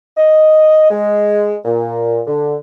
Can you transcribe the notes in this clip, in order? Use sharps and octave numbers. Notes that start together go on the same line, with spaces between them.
D#5
G#3
A#2
D3